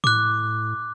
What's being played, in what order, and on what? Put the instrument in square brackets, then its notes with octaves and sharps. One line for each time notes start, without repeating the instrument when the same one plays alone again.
[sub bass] A2 [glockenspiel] D6 F#6